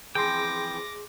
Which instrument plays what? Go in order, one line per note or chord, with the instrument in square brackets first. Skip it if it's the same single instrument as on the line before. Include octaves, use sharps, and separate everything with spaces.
[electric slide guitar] E3 F3 C4 [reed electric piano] G#4 C6 [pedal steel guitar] G5 [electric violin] D6 A#6